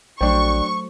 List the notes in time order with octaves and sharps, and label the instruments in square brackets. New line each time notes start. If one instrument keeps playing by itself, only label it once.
[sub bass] A#1 [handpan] F#3 A3 C5 [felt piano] D4 G5 [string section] C#6